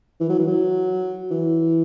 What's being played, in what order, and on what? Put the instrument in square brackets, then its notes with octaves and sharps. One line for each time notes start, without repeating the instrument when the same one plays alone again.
[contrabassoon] E3
F#3
E3
F#3
E3